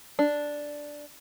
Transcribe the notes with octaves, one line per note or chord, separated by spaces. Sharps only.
D4